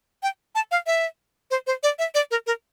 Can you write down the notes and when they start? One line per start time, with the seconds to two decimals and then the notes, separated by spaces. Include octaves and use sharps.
0.23 G5
0.55 A5
0.71 F5
0.86 E5
1.51 C5
1.67 C5
1.83 D5
1.99 E5
2.15 D5
2.31 A#4
2.47 A#4